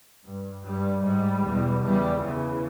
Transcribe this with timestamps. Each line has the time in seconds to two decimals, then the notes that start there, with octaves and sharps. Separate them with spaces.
0.25 G2
0.65 G2 G3
1.05 G#2 G3
1.43 E2 B2
1.83 E2 C#3 G3
2.22 E2 C#3 E3